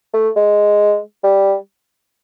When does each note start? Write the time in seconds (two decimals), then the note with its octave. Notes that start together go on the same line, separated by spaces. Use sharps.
0.14 A3
0.36 G#3
1.24 G3